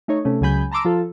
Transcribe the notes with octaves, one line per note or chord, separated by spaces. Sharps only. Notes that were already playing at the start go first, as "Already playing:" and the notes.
A3 D#4 C#5
C3 A3 C#4
C#2 C#3 F#3 G#5 B5 G6
A5 A#5 C6 D6 E6
F3 F4 A4